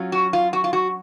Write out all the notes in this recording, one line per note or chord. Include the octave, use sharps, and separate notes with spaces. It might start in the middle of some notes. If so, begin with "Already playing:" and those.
Already playing: F#3 C#4 F4
F#4
F4
F#4
F4
F#4